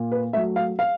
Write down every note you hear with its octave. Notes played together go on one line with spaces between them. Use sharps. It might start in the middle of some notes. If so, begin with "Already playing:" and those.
Already playing: A#2
B4
F#3 A3 E5
F5
F5